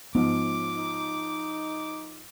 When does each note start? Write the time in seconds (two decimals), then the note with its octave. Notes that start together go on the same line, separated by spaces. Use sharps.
0.15 G#2 F3 B3 D6
0.76 D#4